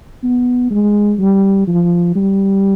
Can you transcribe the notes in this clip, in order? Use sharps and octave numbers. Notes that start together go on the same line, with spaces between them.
B3
G#3
G3
F3
G3